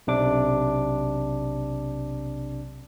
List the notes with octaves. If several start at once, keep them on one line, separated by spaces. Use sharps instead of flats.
B1 C3 D4 D6